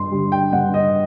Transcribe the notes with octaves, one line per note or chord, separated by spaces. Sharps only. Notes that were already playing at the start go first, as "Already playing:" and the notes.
Already playing: G2 C6
D3 G3
G5
G2 F#5
D#5